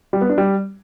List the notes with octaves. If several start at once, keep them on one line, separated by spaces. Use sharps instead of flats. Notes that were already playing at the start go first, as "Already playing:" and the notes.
G3
B3
D4
G3